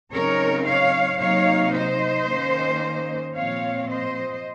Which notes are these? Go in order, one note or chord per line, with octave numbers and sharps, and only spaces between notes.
C#3 F#3 C4 D#4 A#4 C#5
C#5 F5
C3 F#3 A#3 D#4 C#5 F5
C5 D#5
D#3 A#3 C#4
A#2 F3 C4 C#5 F5
C5 D#5